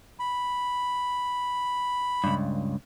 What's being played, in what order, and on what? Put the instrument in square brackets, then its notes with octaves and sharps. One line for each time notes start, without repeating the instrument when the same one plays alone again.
[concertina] B5
[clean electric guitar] C#2 G2